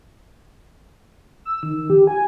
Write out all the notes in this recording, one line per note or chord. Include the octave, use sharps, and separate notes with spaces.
E6
D#3
D#3
G4
G#5